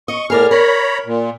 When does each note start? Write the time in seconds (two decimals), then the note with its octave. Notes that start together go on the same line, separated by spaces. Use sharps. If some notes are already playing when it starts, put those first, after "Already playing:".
0.08 D#5 C#6
0.30 A2 G#4 A#4 D5 F6
0.51 A#4 C#5 A#5 B5
1.06 A#2